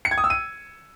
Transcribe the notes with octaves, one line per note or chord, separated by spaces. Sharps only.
C#7
G#6
D#6
E6
D#7